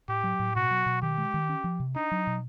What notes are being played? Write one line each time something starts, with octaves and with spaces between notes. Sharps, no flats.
A2 G4
F#3
A2
B2 F#4
F#3
B2
D#3 G4
G#3
D#3
C#4
F3
C3
D4 D#4
F#3
B2